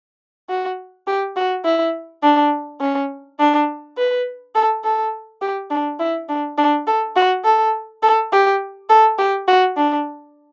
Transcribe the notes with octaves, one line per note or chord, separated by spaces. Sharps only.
F#4
G4
F#4
E4
D4
C#4
D4
B4
A4
A4
G4
D4
E4
D4
D4
A4
F#4
A4
A4
G4
A4
G4
F#4
D4